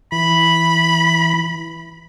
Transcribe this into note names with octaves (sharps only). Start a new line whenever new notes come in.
E3 B5